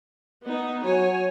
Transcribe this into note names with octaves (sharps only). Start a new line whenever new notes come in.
B3 D#4
F#3 C#5 G#5